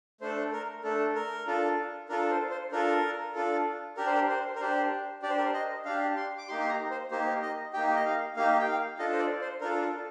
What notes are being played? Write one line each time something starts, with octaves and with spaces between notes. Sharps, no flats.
A3 D4 A4 C5
A#4
A3 D4 A4
A#4
D4 F4 A4
D4 F4 A4 A#4
C5
C5
D4 F4 A4 A#4
D4 F4 A4
D4 G4 A#4
C5
A#4
C5
A#4
D4 G4 C5
D4 G4 D5
C5
A#4
C5
D#5
D4 G4 F5
C6
D6
A#3 D#4 G4 C6
C6
A#5
C5
A#3 D#4 G4 C5
D#5
A#3 D#4 G4 G5
D#5
F5
A#3 D#4 G4 F5
G5
F5
D4 F4 A4 D#5
C5
D5
C5
D4 F4 A4 A#4
A4